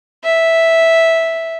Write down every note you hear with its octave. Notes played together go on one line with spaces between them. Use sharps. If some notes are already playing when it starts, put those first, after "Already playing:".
E5